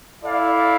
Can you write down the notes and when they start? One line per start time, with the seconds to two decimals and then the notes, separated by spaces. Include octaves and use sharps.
0.22 E4 A4 D5 F5